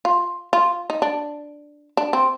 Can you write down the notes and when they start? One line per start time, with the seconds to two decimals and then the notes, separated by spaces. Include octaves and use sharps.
0.05 F4
0.53 F4
0.90 D#4
1.02 D4
1.97 D4
2.13 C4